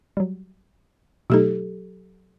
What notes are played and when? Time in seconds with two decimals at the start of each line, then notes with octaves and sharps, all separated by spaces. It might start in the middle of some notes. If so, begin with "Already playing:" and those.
0.17 F#3 G3
1.30 B2 F#3 A3 D#4 G4 A4